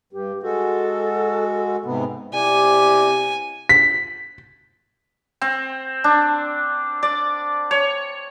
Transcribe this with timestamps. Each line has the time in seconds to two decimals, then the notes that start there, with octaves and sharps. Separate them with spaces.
0.13 G2 G4
0.43 G#3 F#4 A4
1.85 G#2 C3 B3
2.34 C3 E4 G4 D5 G#5
3.69 B6
5.41 C4
6.04 D4
7.03 D5
7.71 C#5